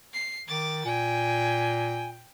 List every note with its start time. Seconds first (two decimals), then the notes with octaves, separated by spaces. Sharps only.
0.13 C7
0.48 D#3 D6 A6
0.85 A#2 G5 G#5